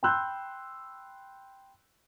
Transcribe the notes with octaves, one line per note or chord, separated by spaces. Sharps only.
G5 B5 C6 E6 F#6 G6